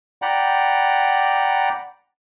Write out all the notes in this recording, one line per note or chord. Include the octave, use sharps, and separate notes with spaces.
D5 F#5 G5 A#5 B5